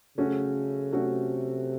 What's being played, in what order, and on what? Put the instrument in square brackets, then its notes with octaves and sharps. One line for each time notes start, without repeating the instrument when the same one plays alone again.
[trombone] C#3 [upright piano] F#3 A3 C#4 F#4
[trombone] C3 [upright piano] F#3 A3 C#4 F#4